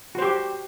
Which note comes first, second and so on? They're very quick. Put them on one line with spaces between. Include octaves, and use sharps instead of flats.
F#4 C5 G4